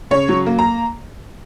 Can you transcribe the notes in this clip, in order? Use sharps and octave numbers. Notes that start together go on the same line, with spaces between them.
C#3 C#5
F#3
A#3
A#5